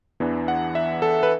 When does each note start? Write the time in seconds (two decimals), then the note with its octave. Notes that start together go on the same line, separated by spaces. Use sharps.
0.20 E2 E3 B3 D4
0.48 F#5
0.75 E5
1.02 A4
1.23 B4